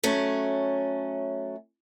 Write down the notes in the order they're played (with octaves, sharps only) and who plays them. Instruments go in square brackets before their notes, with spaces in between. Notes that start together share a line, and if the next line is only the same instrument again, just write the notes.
[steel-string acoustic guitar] F#3 A3 C#4